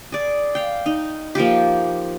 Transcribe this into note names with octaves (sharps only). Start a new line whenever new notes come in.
G#4 D5
F5 G5
D#4
F3 A#3 F4 G4